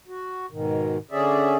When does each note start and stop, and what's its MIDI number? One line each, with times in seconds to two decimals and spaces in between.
0.08 0.46 66
0.51 0.97 44
0.51 0.97 47
0.51 0.97 51
1.11 1.57 50
1.11 1.57 61
1.11 1.57 68
1.11 1.57 74
1.11 1.57 76